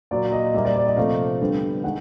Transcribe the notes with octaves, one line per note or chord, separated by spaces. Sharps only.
A#2 F#3 A#3 D5
D#5
A#2 G3 A#3 E5
D5
D5
D#5
C3 F3 A3 F5
D3 G3 B3
D#3 G#3 F#5